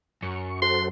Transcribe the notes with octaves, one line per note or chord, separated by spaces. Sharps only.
F#2 C#6
F#4 A4 C5 C6